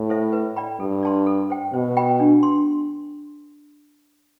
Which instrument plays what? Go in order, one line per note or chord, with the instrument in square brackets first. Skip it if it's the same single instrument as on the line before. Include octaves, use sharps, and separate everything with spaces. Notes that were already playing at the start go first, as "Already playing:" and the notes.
Already playing: [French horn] A2
[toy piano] A4 C5 E5
B4
D5 G5 B5
[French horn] G2 [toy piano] A4
[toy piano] D5 A5 C6
A4
C5 G5
[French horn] B2 [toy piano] C5
[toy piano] G5 B5
D4
C6